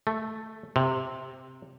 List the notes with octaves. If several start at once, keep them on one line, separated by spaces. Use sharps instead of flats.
A3
C3